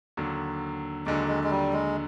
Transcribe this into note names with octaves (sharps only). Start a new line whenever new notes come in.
D#2 D3 F#3
D#2 D3 F#3 G#3
G#3
G#3
G3
G#3